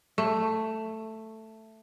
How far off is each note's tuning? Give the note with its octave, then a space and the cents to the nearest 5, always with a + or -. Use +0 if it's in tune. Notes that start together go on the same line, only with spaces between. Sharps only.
A3 +5